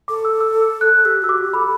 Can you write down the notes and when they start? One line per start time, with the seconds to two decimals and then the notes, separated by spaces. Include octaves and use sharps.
0.08 A4 D6
0.25 E6
0.40 E6
0.81 F#6
1.05 G4 E6
1.22 F#4 E6
1.29 D6
1.38 G4
1.53 A4 B5